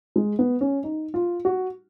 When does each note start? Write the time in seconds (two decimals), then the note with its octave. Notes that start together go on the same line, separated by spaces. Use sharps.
0.16 G#3
0.39 B3
0.61 C#4
0.84 D#4
1.14 F4
1.45 F#4